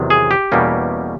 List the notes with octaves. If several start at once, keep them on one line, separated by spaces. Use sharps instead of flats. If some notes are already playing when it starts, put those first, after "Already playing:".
Already playing: E2 C3 D#3 F#3
G#4
G4
E2 B2 G3 A#3 C#4